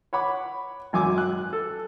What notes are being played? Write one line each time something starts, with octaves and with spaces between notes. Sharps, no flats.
C#5 F#5 B5 D6
G#1 F#2 G#5 D6
F#6
A4